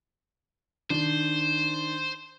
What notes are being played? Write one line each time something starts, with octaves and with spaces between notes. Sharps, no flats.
D#3 D4 C5